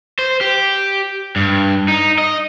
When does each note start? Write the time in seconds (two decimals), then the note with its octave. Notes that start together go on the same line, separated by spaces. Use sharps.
0.19 C5
0.41 G4
1.36 G2
1.88 D#4
2.18 D#5